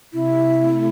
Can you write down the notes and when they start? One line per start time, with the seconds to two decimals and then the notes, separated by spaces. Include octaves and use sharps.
0.12 C3 E4
0.60 A3